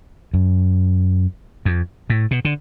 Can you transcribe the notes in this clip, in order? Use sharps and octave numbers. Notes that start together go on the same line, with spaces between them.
F#2
F2
A2
B2
D3